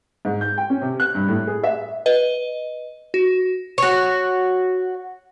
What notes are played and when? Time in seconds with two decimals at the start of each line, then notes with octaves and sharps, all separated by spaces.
0.25 G#2
0.41 G6
0.58 G5
0.70 C#4
0.82 C3
1.00 F#6
1.15 G2
1.29 A2
1.47 G#4
1.63 E5
2.06 B4 D#5
3.14 F#4
3.78 F#4 C#5